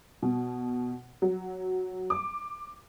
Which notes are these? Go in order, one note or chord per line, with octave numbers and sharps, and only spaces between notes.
B2
F#3
D6